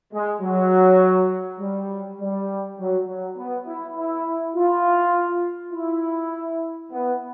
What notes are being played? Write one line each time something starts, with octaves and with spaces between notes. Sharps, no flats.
G#3
F#3
G3
G3
F#3
F#3
B3
E4
E4
F4
E4
B3